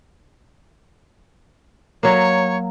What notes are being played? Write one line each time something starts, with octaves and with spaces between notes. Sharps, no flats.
F#3 A#3 C#5